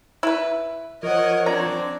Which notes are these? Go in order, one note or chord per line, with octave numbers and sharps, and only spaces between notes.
E4 B4
F3 A#4 C#5 D#5 F#5
C4 D4 D5 A#5